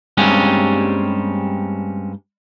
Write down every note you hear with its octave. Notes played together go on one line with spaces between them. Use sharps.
G2 G3 G#3 A#3 C4 C#4